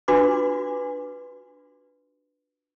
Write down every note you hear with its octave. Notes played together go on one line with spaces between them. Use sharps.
D4 F4 F#4 B4 C6 D6